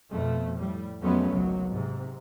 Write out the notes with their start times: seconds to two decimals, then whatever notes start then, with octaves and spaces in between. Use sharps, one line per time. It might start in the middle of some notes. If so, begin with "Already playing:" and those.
0.10 F2 B2 A3
0.57 A2 G3
1.02 F2 F#3 G#3 A3 B3 C#4
1.33 G#1 C#2 F#3
1.70 G#2 C3